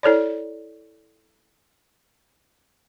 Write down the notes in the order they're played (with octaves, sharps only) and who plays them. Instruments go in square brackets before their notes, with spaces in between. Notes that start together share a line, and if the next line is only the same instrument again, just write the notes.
[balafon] E4 A4 C#5 D5